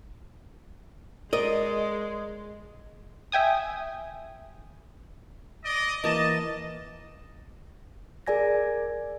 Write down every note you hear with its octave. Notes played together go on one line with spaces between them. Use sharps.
G#3 A#4 D5 D#5
E5 G5 G#5 D#6
D5 D#5
E3 A#3 D#5 A5
G#4 A#4 D5 G#5 G#6 A#6